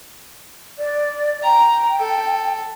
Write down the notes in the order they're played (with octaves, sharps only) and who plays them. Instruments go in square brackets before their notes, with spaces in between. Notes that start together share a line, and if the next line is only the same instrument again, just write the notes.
[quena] D5
[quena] G5 [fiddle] A#5
[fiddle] A4